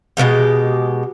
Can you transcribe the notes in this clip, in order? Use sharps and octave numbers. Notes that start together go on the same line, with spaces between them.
B2 D#3 G#3 G4